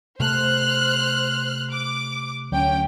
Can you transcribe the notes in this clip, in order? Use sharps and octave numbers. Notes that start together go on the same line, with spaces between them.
C3 A3 C5 F6 F#6
D6
D2 F#3 C#4 G5